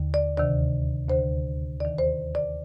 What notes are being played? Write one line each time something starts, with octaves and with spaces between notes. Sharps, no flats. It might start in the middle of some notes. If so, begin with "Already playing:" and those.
Already playing: D#2 D3
D5
D2 C3 D#3 D5
D2 D3 C5
D#2 D#3 D5
C5
D5